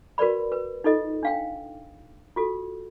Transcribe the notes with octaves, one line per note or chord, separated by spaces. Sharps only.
F#4 A#4 B4 D5 B5
B4
D#4 F4 A4 D#5
D4 F5 G5
F4 F#4 A4